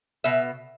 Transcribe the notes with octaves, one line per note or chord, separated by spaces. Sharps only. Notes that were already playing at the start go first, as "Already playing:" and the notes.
B2 E5